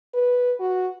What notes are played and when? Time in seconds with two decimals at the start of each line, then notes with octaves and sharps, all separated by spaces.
0.14 B4
0.60 F#4